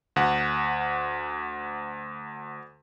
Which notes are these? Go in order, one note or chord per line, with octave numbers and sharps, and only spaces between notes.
D2 F#5